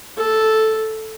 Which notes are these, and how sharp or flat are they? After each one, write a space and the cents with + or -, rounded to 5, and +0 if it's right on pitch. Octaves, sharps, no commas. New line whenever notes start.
A4 -5